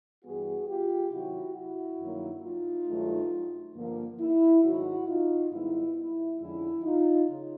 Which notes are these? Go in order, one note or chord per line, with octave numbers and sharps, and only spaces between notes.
G2 E3 G3 B3 F#4 G#4
F4 G4
C3 D#3 F#3 E4 F#4
E4 F#4
G2 D#3 F#3 A#3
D#4 F4
G2 D#3 F#3 A3
G2 D3 F3 A#3
E4
G#2 D#3 F#3 E4 F#4
D#4 F4
G#2 D#3 G3 B3 D#4 E4
E4
F2 D3 F3 G#3 C#4 E4
D#4 F4
C#3